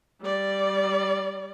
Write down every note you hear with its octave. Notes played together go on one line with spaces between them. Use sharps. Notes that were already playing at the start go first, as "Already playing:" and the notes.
G3 D5